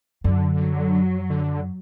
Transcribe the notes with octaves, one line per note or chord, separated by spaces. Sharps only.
F#2 D3
F#3
D3